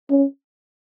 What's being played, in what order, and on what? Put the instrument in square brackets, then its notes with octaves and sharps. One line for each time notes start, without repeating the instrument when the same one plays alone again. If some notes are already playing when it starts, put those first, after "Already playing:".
[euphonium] C#4